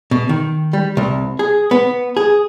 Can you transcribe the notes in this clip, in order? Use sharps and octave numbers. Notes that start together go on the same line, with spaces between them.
B2
D#3
G3
C2
G#4
B3
G#4